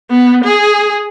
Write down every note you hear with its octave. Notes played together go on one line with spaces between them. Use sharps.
B3
G#4